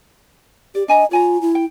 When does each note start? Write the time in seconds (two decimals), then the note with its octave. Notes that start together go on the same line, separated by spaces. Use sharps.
0.75 G4 D5
0.88 D4 D#5 G#5 A#5
1.11 F4 C#5 G#5 A#5
1.41 E4
1.55 G5